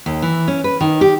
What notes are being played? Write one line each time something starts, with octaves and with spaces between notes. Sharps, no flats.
D#2
E3
C#4
B4
D#3
G4